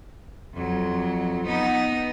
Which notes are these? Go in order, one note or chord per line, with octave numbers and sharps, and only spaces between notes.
F2 F#3
B3 D#4